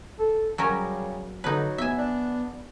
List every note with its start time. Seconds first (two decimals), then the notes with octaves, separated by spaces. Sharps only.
0.19 A4
0.58 C#3 F#3 G3 C#4 A#4
1.44 D3 F#3 D#4 B4
1.78 B3 E5 G#5
1.98 D4